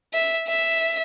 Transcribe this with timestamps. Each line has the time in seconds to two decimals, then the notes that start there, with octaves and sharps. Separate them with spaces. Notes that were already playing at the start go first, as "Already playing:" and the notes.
0.13 E5
0.48 E5